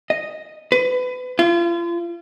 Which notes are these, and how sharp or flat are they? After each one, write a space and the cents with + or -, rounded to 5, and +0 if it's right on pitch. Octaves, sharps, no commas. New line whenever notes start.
D#5 -5
B4 +30
F4 -35